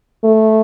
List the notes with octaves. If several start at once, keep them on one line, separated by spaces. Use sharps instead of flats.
A3